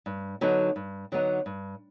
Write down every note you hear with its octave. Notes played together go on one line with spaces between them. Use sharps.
G2
D3 F#3 B3 D#4
G2
D3 F#3 B3 D#4
G2